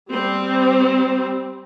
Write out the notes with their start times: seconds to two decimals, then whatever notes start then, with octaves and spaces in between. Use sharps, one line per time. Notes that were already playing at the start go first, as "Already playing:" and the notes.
0.10 G3 C4